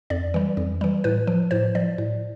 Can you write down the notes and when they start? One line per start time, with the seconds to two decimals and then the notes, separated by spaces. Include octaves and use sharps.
0.10 F2 D5
0.34 E3 G3
0.57 F2
0.81 E3 G3
1.04 A2 B4
1.27 F3
1.51 A2 C5
1.75 F3 D5
1.98 A2